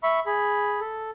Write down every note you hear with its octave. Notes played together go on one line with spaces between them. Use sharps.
E5 B5 C#6
G#4 B5
A4